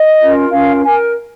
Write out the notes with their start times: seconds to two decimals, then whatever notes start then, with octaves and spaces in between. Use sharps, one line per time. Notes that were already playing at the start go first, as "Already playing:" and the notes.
Already playing: D#5
0.20 C#4 F4 A#4
0.51 C#4 F4 A#4 F5
0.83 A#4 G#5